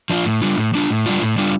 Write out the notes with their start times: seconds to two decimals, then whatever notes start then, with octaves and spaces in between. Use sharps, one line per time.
0.10 F3 D4 F4
0.25 A2
0.42 G3 D4 F4
0.58 A2
0.74 G3 D4 F4
0.90 A2
1.06 G3 D4 F4
1.21 A2
1.38 G3 D4 F4